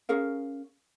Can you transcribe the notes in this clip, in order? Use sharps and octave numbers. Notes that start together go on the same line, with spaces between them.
C#4 G#4 A#4 F5